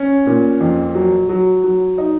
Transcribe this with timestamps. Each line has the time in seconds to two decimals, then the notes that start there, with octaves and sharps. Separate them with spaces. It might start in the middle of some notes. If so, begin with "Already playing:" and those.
Already playing: C#4
0.26 A#2
0.61 F2
0.95 F#3
1.29 F#3
1.64 F#3
1.98 D#4